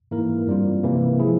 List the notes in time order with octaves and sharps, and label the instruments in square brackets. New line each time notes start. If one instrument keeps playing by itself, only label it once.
[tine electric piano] G#2 E3 A#3 E4 A#4
G2 G3 C4 F4
C3 E3 A#3 E4
F3 G#3 E4 G#4